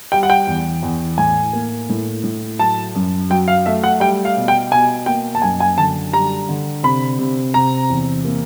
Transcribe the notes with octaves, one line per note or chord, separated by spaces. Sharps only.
G3 G5
F#5
G5
E2
E2
A2 G#5
A#3
A2
A2
F#3 A5
F#2
F#3 G5
F5
A3 E5
F#5
G3 G5
F5
B2
G5
B2 G#5
A#3 G5
A5
F#2 G#5
G#5
D3 A5
G3 A#5
D3
C3 B5
C3
C3 A#5
E2
A#3